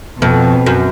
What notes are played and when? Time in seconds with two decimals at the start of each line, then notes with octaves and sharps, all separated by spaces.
0.22 F2 B2
0.66 F#2